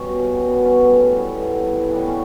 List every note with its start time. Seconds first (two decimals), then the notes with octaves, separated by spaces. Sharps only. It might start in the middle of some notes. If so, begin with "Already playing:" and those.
Already playing: B2 G3 C#4
0.29 B2 G3
0.48 B3
0.65 C#4
0.83 A2 G3 B3
1.37 A2 G3
1.90 C#3 G3 B3
2.08 C#4